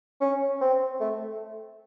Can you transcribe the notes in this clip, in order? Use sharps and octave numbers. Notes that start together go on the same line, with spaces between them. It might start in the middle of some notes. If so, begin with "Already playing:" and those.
C#4
C4
A3